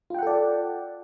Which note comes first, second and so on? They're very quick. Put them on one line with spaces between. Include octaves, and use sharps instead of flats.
F4 G5 F#5 A4 D5